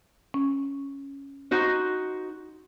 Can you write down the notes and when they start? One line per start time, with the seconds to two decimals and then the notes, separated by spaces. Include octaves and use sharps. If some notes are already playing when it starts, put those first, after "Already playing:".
0.34 C#4
1.51 D#4 F#4 C5